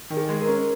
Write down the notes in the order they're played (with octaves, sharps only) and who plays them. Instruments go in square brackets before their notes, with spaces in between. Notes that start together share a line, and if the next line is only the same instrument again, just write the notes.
[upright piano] D#3
[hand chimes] G#4
[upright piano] G#3
[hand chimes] A#4
[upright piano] C#4